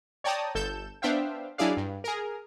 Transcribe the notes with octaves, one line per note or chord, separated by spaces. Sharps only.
C#5 D5 G5 A5 A#5 D#6
G1 A4 G6 E7
B3 D4 C5 E5 F5 G5
F#3 D4 E4 G#4 D5 F5
G2
G#4 A#4